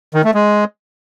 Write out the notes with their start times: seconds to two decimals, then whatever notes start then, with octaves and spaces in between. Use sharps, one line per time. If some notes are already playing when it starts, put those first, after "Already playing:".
0.14 D#3
0.24 A3
0.34 G#3